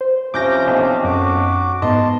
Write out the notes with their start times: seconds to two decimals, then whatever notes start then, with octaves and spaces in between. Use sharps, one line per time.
0.01 C5
0.34 C2 C3 F3 C#4 D6 G6 A#6
0.67 B1 C4
1.04 F#2 F#4 D6
1.82 G#2 B3 D#5 A5 C6